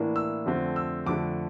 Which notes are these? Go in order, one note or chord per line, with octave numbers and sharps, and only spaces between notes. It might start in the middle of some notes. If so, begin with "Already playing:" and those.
Already playing: A2 E3 A#3 D4
E6
F2 D3 A3 C4
E6
F2 D3 A3 D6